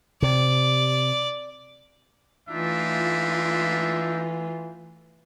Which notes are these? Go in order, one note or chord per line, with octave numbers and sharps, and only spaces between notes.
C3 D5
E3 A3 D4 D#4 F4 E5